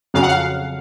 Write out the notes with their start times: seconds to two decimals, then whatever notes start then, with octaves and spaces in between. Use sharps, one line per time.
0.14 F2 C#3 F#3 F5
0.22 F#5
0.28 F5